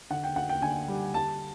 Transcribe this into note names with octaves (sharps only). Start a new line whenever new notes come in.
D3 F#5
G5
D2 F#5
G5
D3 G#5
G3
G3 A5